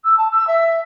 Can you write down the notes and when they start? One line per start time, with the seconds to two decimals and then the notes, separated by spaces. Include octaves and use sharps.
0.04 E6
0.17 A5
0.31 E6
0.47 E5